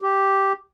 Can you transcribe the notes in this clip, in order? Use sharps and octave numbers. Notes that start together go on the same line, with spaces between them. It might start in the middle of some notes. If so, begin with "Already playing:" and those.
G4